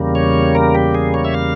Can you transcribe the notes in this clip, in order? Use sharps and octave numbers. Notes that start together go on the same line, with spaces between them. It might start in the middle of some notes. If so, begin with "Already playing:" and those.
Already playing: E2 C#3 G3 A#3
C#5
A#4
G4
G#4
C#5
E5
F5